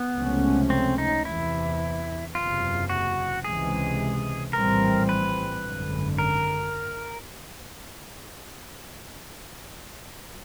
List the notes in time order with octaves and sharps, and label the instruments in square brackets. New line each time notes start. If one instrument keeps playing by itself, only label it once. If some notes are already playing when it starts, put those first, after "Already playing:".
Already playing: [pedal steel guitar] B3
[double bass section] C#2 C3 F3 A3 C#4
[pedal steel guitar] C4
D#4
[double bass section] E2 C3 E3 [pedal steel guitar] E4
[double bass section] F#1 E2 C3 [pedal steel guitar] F4
[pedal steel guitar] F#4
[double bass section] C#2 C3 E3 G#3 [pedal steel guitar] G#4
[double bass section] A#1 A2 E3 G3 C4 [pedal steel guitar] A#4
[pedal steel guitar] B4
[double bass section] G#1 F#2 D3
[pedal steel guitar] A#4